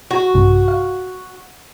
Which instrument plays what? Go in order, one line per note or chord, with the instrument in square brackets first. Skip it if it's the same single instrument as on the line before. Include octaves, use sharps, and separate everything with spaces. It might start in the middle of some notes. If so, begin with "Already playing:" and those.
[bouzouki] F#4
[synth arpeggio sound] A#1 G2 C3
F5